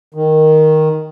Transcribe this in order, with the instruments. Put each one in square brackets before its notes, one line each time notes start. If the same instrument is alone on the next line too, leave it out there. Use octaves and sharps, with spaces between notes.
[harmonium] D#3